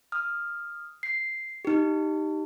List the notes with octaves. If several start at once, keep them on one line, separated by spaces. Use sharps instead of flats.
D#6 F6
C7
D#4 G4